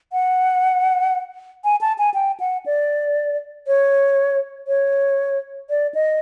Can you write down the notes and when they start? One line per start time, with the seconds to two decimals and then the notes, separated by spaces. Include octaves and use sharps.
0.12 F#5
1.64 G#5
1.81 A5
1.98 G#5
2.14 G5
2.40 F#5
2.66 D5
3.67 C#5
4.68 C#5
5.70 D5
5.95 D#5